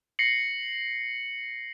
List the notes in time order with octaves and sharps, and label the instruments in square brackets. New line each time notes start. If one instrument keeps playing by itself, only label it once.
[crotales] A#6 C7 C#7 F#7